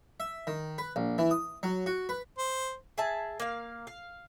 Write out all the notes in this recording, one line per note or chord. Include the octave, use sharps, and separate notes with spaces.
E5
D#3
B4
A#1
E3
D#6
F#3
F#4
B4
C5
G#4 E5 A5
A#3 F5
F5